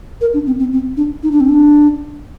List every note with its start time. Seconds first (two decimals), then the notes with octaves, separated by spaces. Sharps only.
0.21 A#4
0.34 D4
0.47 C4
0.59 C4
0.73 C4
0.97 D4
1.23 D#4
1.31 D4
1.40 C4
1.49 D4